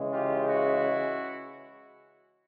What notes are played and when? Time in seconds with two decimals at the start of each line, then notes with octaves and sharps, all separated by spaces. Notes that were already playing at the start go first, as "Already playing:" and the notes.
Already playing: C#3 E3 G#3
0.12 F4 G4
0.48 E4 F#4